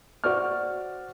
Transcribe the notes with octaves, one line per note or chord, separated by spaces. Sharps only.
F#4 C5 D5 C#6 F6